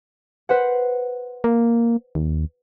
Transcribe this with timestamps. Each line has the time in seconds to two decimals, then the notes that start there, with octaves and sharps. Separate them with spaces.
0.49 B4 C5 F#5
1.44 A#3
2.15 D#2